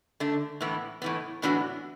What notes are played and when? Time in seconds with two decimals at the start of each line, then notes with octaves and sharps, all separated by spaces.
0.20 D3 A3 D4
0.61 A2 E3 B3
1.02 A2 E3 B3
1.42 A2 E3 B3 D4 F#4